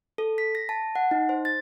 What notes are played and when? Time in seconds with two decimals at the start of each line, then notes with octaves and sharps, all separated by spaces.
0.18 A4
0.38 B6
0.55 A#6
0.69 A5
0.95 F#5
1.11 D#4
1.29 C5
1.45 A6